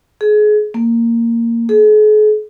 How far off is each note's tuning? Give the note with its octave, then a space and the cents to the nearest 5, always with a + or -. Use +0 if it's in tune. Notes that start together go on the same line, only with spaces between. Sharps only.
G#4 +30
A#3 -10
G#4 +45